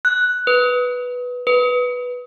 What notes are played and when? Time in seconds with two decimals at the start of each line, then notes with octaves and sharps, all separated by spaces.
0.05 F#6
0.47 B4
1.47 B4